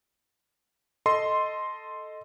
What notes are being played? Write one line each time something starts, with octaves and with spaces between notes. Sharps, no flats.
A4 D#5 C6